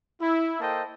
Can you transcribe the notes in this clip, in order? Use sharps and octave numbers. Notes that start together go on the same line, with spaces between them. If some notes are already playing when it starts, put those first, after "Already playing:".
E4
A#3 A4 C5 D#5 G5 A5